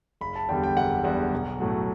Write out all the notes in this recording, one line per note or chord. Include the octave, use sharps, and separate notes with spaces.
F#1 B5
A5
E2 D3 G3 G5
G5
F#1 F#5
E2 D3 G3 F#5
B1
A2 F#3 A3